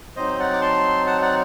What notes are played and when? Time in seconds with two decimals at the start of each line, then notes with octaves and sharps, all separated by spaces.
0.16 F#3 C4 D#4 C5 D#5
0.39 D5 F#5
0.53 D6
0.61 A5 C6
1.07 F#5 A5
1.21 D5 F#5